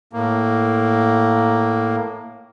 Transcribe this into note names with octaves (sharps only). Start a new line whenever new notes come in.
A2 A#3